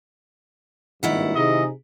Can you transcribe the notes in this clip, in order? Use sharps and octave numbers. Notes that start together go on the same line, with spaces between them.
G#1 G2 A#2 D#3 E4 F#5
C3 D#4 G#4 D#5